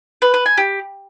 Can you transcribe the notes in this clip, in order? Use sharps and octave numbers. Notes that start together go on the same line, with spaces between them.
B4
B4
G#5
G4